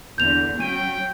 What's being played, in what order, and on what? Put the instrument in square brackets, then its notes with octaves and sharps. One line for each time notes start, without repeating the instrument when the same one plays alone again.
[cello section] E2 D3 [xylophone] G6 F7
[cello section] F#3 C#4 [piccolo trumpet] G5 [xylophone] D#7